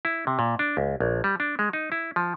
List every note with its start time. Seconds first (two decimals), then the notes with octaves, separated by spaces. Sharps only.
0.05 E4
0.27 C3
0.39 A#2
0.59 D4
0.77 C#2
1.00 A#1
1.24 G3
1.40 D4
1.59 G#3
1.73 D#4
1.92 E4
2.16 F3